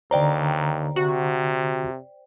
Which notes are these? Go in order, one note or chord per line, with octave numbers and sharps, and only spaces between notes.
D#2 D3 C5 D5 G5 A#5
C3 F#4